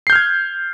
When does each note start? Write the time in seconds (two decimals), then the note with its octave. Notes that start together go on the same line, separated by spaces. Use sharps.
0.07 C7
0.10 G6
0.13 F6
0.15 G#6